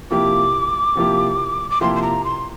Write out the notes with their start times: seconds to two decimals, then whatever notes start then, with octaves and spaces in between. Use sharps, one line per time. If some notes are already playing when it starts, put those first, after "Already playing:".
0.11 C3 F3 A#3 E4 G4 D6
0.95 C3 F3 A#3 E4 G4
1.70 D6
1.81 C3 F3 A#3 E4 G4 C6
1.95 C6
2.02 A#5
2.24 C6